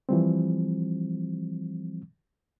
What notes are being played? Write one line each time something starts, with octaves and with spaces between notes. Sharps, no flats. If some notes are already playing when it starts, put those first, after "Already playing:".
E3 F3 G3 C4